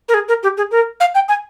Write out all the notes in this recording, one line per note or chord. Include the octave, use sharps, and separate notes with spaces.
A#4
G#4
A#4
G4
G#4
A#4
F5
G5
G#5